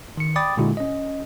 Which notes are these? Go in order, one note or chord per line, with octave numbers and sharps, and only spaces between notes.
D#3 C#7
D5 G5 B5 D6 D#6 A6
A#2 D3 G#3 E4 F#4
C#4 D#5